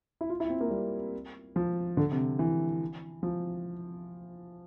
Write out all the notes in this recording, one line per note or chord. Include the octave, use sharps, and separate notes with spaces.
E4
F4
E4
C4
A#3
G3
F3
D3
C3
E3
F3